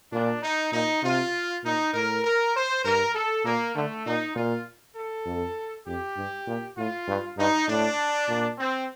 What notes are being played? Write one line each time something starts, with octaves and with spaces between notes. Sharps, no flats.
A#2 D4
D#4
A#2 D#4
C3 F4
A#2 D#4
A2 A#4
A#4
C5
G2 A#4
A4
A#2 A#3
D3 A3
A#2 D#4
A#2 F4
A4
F2
F2 G4
G2
A#2
A2 F4
G2
G2 D#4
A2 D4
A#2
C4